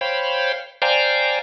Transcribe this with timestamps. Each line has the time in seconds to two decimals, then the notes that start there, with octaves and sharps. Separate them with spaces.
0.01 C5 C#5 F5 G5 B5
0.82 C5 D5 F5 G5 G#5 A#5